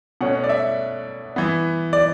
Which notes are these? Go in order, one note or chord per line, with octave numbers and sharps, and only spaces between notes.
B2 A3 C#4 F#5
D5
E5
E3 B3
D5